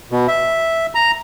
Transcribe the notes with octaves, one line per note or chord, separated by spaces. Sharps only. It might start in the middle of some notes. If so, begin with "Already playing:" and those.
B2
E5
A#5